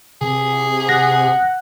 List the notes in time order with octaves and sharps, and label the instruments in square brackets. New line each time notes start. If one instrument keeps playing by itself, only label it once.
[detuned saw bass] C3 [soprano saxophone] G#4
[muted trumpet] F#5 [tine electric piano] A#6